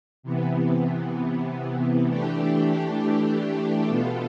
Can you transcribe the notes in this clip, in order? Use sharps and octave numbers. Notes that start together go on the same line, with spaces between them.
C3 E3 B3
E3 A3 D4 G4
B2 B3 F4 A4